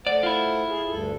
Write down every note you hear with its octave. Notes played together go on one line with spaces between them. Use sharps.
A3 C5 D5 F#5
E4 F4
G#4
D2 G2 A4